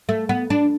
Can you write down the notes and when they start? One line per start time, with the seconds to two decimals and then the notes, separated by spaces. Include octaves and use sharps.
0.09 A3
0.29 B3
0.50 D4